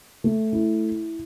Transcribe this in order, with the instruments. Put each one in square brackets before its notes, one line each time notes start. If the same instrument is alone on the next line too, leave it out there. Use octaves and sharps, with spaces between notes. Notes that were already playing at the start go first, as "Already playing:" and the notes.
[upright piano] A3
E4